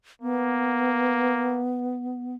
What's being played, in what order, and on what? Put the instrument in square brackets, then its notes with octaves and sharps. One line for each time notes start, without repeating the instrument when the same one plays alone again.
[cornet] A#3 [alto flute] B3